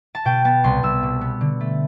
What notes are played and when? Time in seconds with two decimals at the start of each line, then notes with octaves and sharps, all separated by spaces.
0.15 A5
0.25 B2 G5
0.45 B3 A5
0.64 C2 C6
0.83 C2 E6
1.03 B2
1.21 B3
1.41 D3
1.61 A3